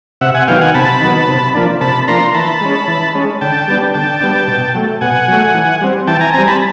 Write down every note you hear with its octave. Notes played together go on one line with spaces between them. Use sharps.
C3 E5 F#5
F#5 G#5
D#3 F#3 B3 F5 G5
F#5 G#5
C3 A5 B5
D#3 F#3 B3
C3
F3 A#3 D4
C3 A5 B5
F3 A#3 D4 A#5 C6
E3 A5 B5
G#3 C#4
E3
G#3 C#4
D3 G5 A5
G3 B3 D4
D3 G5 A5
G3 B3 D4
B2
F#3 A3
B2 F#5 G#5
F#3 A3
E3
G3 C4
E3 G5 A5
G#5 A#5
G3 C4 G#5 A#5
A5 B5